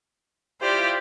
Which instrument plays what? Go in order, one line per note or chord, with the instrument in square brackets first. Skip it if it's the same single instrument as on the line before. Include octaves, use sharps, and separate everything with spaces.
[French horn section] E4 F4 G4 [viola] C5 D5